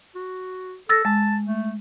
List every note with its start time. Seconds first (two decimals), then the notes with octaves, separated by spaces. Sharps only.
0.15 F#4
0.89 A4 E6 A6 A#6
1.05 G#3 A5
1.46 A3